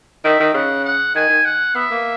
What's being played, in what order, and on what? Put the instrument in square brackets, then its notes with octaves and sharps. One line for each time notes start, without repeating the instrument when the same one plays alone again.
[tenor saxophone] D#3 [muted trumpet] E5
[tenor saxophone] D#3
[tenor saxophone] C#3 [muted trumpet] F#5
[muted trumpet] F#5
[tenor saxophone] D#3 [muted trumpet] G#5
[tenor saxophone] D#3
[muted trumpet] F#5
[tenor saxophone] B3 [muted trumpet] E5
[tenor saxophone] A#3